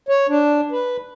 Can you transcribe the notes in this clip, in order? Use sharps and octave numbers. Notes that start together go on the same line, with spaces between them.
C#5
D4
B4